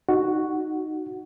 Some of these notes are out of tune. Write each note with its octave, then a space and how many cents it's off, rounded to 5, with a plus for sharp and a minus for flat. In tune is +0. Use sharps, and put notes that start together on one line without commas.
D#4 +0 F#4 +0